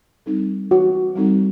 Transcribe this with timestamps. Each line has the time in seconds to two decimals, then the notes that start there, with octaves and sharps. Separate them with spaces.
0.26 G3 C4 D#4 A4
0.71 E3 F#4
1.15 G3 C4 D#4 A4